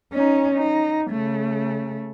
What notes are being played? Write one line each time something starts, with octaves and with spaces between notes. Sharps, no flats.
C#4 D#4
D#4
C#3 A3